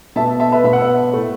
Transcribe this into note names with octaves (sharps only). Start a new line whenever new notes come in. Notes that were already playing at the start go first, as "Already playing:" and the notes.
B2 B3 E5 A5
E5 A5
B4 E5
B2 B3 E5
F#5
B4 E5
A2 A3